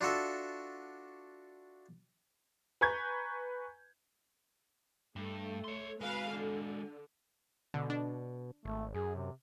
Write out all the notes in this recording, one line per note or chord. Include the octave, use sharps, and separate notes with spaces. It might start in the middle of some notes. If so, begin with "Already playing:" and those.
D4 F4 F#4 A4 E5
B4 G#5 A#5 C#6 G6 G#6
G2 A3
C#5 C6
G#3 F#4 B4 F5
D3
B2 D3
D4
G#1 A3
F#2 G#4
C3